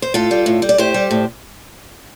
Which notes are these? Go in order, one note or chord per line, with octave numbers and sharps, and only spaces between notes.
C5
A2 F4 A4
G3
A2
G3
D5
A2 G4 C5
G3
A2